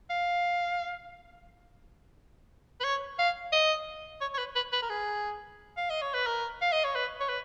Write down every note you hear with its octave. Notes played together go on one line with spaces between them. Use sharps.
F5
B4
C#5
F5
D#5
C#5
C#5
B4
B4
B4
A#4
G#4
F5
D#5
C#5
B4
A#4
F5
D#5
C#5
B4
C#5
B4